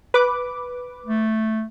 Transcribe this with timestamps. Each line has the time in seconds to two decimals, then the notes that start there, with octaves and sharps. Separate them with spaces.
0.14 B4 D6
1.06 A3